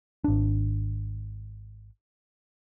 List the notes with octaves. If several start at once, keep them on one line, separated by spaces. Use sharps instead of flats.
G#1 D4